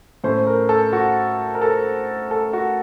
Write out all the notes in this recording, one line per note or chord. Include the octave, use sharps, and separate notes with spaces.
A2 A3 C#4 C5
A#4
A4
F#4
A#4
A4
A4
F#4